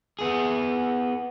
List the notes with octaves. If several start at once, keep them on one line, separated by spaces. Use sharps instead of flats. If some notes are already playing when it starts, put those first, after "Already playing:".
B3 G#4